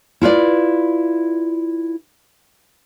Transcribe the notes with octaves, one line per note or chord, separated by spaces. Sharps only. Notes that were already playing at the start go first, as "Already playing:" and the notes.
E4 F4 B4 D5